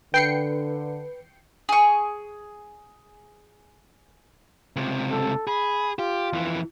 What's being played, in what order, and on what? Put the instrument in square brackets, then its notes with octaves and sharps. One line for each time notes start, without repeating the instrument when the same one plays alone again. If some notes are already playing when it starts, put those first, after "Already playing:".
[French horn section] D3 [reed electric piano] B4 [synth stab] G5 C7 C#7
[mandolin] G#4 C#6
[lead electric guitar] C#2 C3
[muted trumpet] A4
[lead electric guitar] G#4 [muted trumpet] B5
[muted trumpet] F4 [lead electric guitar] G4
[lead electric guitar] F2 E3